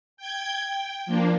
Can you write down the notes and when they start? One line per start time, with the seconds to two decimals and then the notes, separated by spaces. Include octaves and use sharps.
0.17 G5 G6 G#6
0.68 G5
1.06 F3 A#3 D4